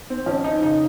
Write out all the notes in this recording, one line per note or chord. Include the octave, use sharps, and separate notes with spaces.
C4
F2 C#4
D#4
C#3 D#4